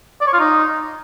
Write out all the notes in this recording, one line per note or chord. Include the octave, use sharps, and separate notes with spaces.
D5
C#5
F4
D#4